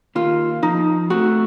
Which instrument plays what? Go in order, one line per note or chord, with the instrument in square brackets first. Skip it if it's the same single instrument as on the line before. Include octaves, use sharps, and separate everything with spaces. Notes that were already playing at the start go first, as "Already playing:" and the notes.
[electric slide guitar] D#3 A#3 [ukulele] F4
[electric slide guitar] F3 [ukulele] D#4
[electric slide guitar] A3 C4 [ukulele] F#4